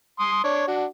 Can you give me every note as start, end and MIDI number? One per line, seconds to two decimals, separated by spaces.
0.19 0.43 84
0.19 0.43 87
0.44 0.66 62
0.44 0.66 73
0.67 0.85 62
0.67 0.85 66